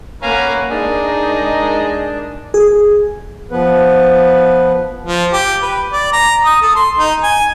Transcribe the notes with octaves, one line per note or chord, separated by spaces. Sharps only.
A#3 C#4 A#4 B4 F5 F#5 G#5 A#5
G#3 D4 D#4 G#4 A#4 D#5
G#4
F3 B3 B4
F3
G4
B4
D5
A#5
D#6
A4
C6
D#4
G#5